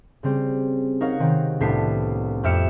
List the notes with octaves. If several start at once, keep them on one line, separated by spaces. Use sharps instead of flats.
C#3 G3 C4
D#4 F#4 A#4 C#5 F5
C3 D#3 C4
C2 A2 B3 D4 B6 C7
F2 G4 E5 F6 C#7 E7